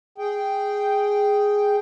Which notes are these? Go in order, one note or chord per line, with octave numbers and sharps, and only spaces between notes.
G#4 G5